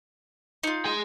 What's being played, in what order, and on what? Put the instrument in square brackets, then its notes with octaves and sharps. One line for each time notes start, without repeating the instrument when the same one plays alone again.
[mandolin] D#4 F4
[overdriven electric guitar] G#4 C6